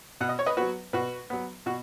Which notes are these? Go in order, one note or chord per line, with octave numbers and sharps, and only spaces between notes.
B2 F#5
D#5
C#5
B4 D#5
F#3 B3 F#4 B4
B2 F#4 B4
F#3 B3
B2 F#4